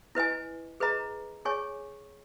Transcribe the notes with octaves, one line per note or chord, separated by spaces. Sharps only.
E4 B4 D#5 G#5
G#4 B4 D#5 A#5
G#4 C#5 G#5 C#6